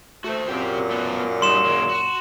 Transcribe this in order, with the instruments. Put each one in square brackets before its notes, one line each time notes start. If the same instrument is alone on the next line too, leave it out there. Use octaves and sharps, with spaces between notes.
[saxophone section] A3 [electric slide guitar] F#4 C5
[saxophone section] F#2 A#2 [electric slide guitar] C4 G4 G5
[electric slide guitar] A3 B3 F#4
[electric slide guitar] G3 D#4 [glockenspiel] C6 E7
[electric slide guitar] D#3 G#3 A#3
F#4